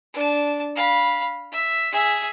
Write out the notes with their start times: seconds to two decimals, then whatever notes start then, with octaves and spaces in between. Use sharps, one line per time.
0.13 D4 A5
0.76 F5 B5
1.52 E5
1.92 G#4 E5